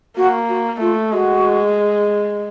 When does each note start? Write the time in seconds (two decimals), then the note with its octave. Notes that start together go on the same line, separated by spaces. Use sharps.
0.17 A#3 F#4
0.49 F#4
0.80 A3 F4
1.12 G#3 F#4